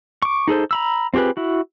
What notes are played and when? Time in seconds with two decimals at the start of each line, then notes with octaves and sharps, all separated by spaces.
0.22 C#6 D6
0.48 D#4 G#4 A4 C5
0.71 A#5 B5 E6
1.14 C4 F4 G4 G#4 B4
1.37 E4 F#4